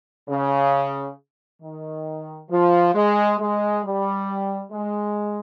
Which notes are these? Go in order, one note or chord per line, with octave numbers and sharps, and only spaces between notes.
C#3
D#3
F3
G#3
G#3
G3
G#3